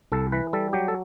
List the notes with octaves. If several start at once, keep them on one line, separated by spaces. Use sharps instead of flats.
C2 A4
E3 B4
G3 A4
F#3 G4
A4